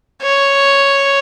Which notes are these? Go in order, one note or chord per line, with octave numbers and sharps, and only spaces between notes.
C#5